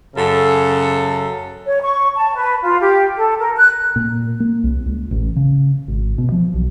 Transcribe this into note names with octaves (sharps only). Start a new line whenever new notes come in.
F#2 C#3 A4
C#5
C#6
A5
B4
F4
G4
A4
A#4
F#6
A#2
A#3
C2
C#2
A1
C#3
G#1
B2
F3
B1